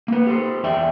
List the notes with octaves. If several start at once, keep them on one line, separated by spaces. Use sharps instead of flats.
A#3 B4
G4 A4 C5
E2 D5 E5 G5